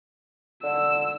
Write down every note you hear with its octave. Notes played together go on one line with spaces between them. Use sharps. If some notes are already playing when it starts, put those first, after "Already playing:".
D3 E6